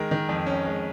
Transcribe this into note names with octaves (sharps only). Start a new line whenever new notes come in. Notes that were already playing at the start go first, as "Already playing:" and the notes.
Already playing: D#3 G#3 A#4
D#3
F2
C#4
G#3